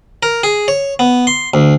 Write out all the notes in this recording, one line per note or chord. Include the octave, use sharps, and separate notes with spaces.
A#4
G#4
C#5
B3
C6
D2